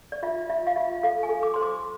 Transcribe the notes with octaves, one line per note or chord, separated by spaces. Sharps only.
D5
F4 E5
F4 E5
F5
F4 E5
A4 F5
G#5
A4
D6
C5 C6
D6